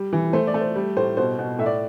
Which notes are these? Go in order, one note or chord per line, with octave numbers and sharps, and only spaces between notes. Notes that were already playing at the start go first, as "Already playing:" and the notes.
Already playing: G3
E3
A3 C5
D5
A3
C5
G3
A2 C5
B2 C5
B2
A2 E5
D5